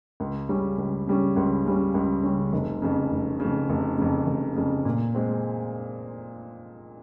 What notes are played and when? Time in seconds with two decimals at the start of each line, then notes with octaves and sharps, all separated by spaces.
0.20 C#2
0.49 C#3 G3 C#4
0.78 C#2
1.07 C#3 G3 C#4
1.36 C#2
1.65 C#3 G3 C#4
1.94 C#2
2.24 C#3 G3 C#4
2.52 F1
2.82 F2 C#3
3.11 F1
3.40 F2 C#3
3.69 F1
3.98 F2 C#3
4.27 F1
4.56 F2 C#3
4.85 A#2
5.15 G#3 C4